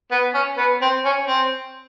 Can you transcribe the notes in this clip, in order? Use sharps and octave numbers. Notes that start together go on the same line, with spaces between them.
B3
C#4
B3
C4
C#4
C4